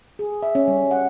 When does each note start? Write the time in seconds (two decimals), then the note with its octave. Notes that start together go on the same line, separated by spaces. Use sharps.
0.19 G#4
0.43 E5
0.55 C#4
0.68 G3
0.91 F#5